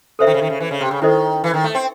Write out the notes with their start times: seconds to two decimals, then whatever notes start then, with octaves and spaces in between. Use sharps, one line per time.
0.19 C#3 A4 C5 E5
0.27 D#3
0.34 C#3
0.42 D#3
0.50 C#3
0.60 E3
0.71 C#3
0.81 C3
0.91 C#3
1.02 D#3 E4 A4 C5 D#5
1.44 E3
1.54 D#3
1.64 A3
1.75 C4